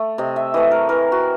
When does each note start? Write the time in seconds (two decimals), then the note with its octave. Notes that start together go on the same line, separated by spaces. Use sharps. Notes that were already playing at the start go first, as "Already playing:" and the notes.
Already playing: A3
0.18 C3 D#5
0.36 E5
0.54 E3 A3 D#5
0.71 A#4
0.89 E3 A#4
1.12 F#4